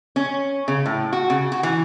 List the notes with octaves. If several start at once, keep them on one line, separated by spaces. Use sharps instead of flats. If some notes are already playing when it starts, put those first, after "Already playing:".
C#4
C#3
A2
F#4
C#3
F#4
E3